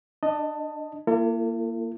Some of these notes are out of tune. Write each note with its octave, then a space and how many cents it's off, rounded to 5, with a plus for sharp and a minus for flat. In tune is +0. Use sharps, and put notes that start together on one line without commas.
D4 +30 D#5 +0 A5 +15
A#3 +0 E4 +45 A4 +45